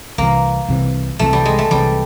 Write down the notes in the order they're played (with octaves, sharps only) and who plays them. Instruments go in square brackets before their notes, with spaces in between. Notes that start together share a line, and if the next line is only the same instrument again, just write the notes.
[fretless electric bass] C2 C3 E3 [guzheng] A#3
[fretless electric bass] C2 C3 E3
[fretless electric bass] C2 C3 E3 [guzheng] A3
[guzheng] G3
G#3
A3
[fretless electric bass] C2 C3 E3 [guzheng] G3